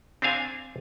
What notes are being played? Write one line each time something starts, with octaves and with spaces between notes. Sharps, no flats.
C4 D4 C5 F5 G#5